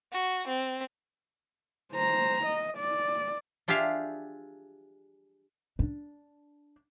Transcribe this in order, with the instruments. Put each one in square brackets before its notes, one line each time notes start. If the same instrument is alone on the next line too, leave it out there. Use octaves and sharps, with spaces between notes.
[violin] F#4
C4
[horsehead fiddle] C5 A#5
D#5
D5
[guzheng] D4 F4 G4 G#4 E5 F5
[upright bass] D4